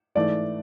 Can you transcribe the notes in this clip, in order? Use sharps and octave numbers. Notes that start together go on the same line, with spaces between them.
G#2 E3 A3 D5